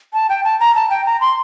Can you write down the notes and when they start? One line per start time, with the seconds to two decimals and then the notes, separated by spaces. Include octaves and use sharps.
0.13 A5
0.29 G5
0.44 A5
0.60 A#5
0.75 A5
0.90 G5
1.06 A#5
1.21 C6